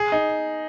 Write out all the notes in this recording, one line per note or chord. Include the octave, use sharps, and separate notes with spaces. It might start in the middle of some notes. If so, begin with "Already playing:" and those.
Already playing: G#4
D#4